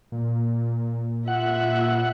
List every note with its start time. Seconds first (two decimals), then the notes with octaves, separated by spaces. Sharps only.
0.12 A#2
1.28 F4 E5 F#5